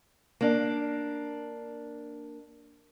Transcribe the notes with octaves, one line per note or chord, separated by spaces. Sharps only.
A#3 D4